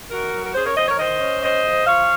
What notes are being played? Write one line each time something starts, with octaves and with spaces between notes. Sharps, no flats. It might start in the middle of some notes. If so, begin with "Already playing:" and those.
D#3 F#4 A#4
F#3
A#4
C#4 G#4 C5
A#4 C#5
F2 C5 D#5
A#4 C#5
D#3 C5 D#5
C#4
C#4 C5 D#5
F2
F3 C#5 F5